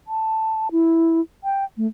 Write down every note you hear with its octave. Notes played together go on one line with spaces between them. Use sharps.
A5
E4
G5
A3